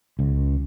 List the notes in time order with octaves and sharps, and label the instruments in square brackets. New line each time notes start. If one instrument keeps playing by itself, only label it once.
[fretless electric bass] C#2